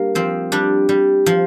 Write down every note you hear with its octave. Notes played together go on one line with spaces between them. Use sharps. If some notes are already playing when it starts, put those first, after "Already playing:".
Already playing: G3 A#3 D4
F3 C4
G3 D4
G3
F3